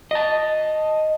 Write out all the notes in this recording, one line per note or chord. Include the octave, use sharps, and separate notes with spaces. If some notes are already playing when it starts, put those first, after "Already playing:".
D#5 A5